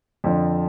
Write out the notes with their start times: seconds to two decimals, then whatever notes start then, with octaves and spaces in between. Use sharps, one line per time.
0.24 F2 D3 F3